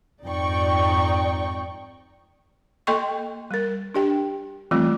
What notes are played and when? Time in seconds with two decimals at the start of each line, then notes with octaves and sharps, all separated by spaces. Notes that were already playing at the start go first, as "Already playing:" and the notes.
0.25 F2 G#2 D#4 D5 G5 C#6
2.87 A#3 A4 D#5 G5 C6 C#6
3.51 G3 A#4
3.95 D4 G4 G5
4.71 E3 F3 G3 A3 C4 F4